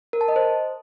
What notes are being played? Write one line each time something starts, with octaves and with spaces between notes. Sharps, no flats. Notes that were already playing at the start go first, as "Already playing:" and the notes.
A#4
A5
D#5
C5